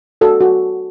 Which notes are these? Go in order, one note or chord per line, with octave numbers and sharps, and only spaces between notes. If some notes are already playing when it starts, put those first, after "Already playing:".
F#4 A4
F#4